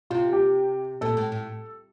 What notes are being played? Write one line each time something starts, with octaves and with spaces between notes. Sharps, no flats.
C3 F4
G4
A#2 A4
A2
A2